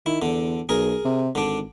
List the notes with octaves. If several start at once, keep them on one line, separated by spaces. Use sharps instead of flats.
D#3 E4
E2 D3
B1 G#4 A#4
C3
G#1 D3 D4